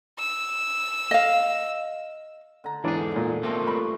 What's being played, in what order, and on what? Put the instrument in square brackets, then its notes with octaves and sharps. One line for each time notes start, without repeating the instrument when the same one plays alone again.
[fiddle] E6
[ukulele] D#5 F5
[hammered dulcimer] D3 A#5
[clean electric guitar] E2 G#2 G#4 [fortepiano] E3 D4 D5
[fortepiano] A#2
[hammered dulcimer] F3 A3 C5 [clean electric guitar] A#3 C4 D#4
[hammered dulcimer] G2 B4 C#6 [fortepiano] B5